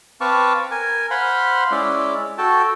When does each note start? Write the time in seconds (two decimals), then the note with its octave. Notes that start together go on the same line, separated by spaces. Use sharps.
0.21 C4 B4 F5 A5 C#6 D6
0.71 A#4 G#5
1.11 C5 F5 F#5 B5 C6
1.71 G#3 C#4 E4 D5
2.38 F#4 A4 G5 A5